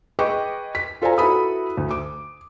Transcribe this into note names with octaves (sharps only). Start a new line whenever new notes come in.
G#4 B4 D#5 G5 C#6 D6
B6
F4 A4 C5 D5 G#5 A#5
E4 F#4 A4 B4 B5 D#6
D2
D6